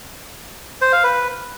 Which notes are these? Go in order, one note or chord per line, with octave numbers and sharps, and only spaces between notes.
C5
F5
B4